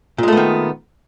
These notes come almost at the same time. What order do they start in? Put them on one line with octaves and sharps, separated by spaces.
A#2 G#3 A3 B3 D#3